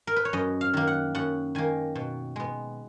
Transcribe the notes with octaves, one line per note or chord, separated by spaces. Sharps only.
A#4
B4
C#5
F#2 D#5
F5
D#3 A#3
F#5
F#2 F#5
D#3 A#3 G#5
B2
G#3 B3